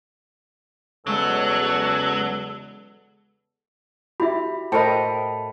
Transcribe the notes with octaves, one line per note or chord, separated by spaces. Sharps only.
E2 C#3 F#3 G#3 A4
E4 F#4 G4 E5 B5
A2 A#4 C5 D#5 G5 A5 B5